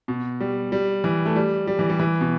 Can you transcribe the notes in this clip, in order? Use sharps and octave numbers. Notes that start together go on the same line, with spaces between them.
B2
G3
G3
E3
A3
G3
G3
E3
G3
E3
B2